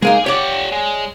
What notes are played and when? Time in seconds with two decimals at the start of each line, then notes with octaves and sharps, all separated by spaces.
0.02 G#3 A#3 D#4 G#4
0.26 G4 C#5 D5 F#5
0.72 G#3